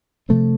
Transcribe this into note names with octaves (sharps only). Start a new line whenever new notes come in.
C3 F3 A3 C4